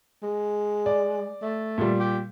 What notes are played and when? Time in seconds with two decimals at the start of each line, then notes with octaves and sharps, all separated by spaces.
0.23 G#3
0.86 D5
1.42 A3
1.78 A#2 G3
1.99 G4